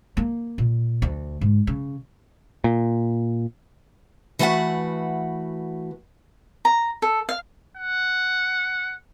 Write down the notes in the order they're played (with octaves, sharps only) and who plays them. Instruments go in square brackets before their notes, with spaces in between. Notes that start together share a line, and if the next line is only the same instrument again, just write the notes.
[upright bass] A#3
A#2
D2
G#2
C#3
[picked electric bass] A#2
[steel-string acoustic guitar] E3 A3 F#4 B4 F#5
[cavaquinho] A#5
A4
F5
[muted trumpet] F#5